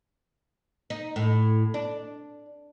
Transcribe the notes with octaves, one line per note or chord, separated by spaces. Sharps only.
D#4
A2
D4